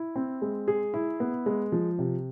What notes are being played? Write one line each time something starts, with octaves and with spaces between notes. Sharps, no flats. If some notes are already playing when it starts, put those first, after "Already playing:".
Already playing: E4
C4
G#3
G#4
E4
B3
G#3
F3
C3